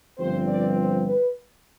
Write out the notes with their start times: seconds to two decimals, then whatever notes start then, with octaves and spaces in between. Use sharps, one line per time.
0.18 G1 G2 F3 C4 C5
0.47 D5
0.76 C5
1.05 B4